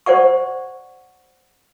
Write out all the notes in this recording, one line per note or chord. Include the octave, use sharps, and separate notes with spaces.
C5 D5 F#5 C#6